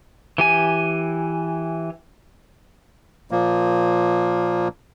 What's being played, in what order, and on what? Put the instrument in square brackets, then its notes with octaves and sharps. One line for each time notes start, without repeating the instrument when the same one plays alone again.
[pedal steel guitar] E3 G4 G#5
[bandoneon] A#2 F3 A#3